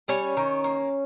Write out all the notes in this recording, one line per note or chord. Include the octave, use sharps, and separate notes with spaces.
G3 C#4 C#5
D#3
A#3